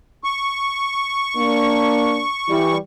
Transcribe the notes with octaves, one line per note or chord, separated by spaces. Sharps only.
C#6
A#3 D4
E3 G3